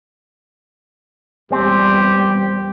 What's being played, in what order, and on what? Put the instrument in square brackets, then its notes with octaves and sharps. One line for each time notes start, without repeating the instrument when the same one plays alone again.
[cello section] E2 A#2 G3 [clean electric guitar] C4 [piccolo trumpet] G4